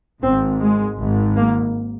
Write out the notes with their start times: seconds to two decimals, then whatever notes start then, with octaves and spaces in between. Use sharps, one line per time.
0.23 G#1 G#2 C4
0.60 G#3
0.98 G#1 G#2
1.36 A#3